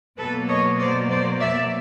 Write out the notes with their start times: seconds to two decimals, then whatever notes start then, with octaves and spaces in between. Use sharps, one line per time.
0.18 B2 F#3 A#3 A4 B4
0.48 C#5 D#5
0.79 C5 D5
1.09 C5 D5
1.40 D5 E5